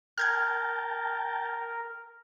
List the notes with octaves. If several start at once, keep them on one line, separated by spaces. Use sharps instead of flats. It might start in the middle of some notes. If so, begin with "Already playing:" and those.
A#4 G5 A5 F6 G6 G#6